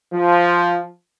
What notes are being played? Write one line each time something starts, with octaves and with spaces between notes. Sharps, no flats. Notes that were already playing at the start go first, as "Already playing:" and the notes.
F3